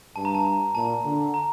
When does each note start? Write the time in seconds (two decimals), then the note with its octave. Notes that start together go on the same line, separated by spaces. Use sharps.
0.16 G2 A5
0.25 A#5
0.35 A5
0.75 A#2 A5
1.05 D3
1.34 A#5